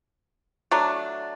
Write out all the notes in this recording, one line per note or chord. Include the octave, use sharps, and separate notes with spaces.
F#3 A3 D4